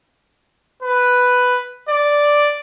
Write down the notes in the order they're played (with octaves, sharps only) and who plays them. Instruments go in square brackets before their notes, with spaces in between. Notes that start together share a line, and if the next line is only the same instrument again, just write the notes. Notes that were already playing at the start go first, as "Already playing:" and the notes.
[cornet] B4
D5